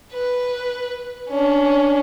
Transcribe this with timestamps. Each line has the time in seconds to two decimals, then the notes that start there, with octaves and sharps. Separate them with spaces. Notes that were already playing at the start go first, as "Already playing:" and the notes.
0.13 B4
1.30 C#4 D4